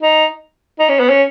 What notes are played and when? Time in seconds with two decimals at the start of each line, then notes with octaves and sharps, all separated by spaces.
0.02 D#4
0.79 D#4
0.89 C#4
1.00 B3
1.10 C#4